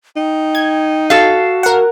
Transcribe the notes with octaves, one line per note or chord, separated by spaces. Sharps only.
D#4 G5
G#6
F#4 A4 F5
A#4 F#5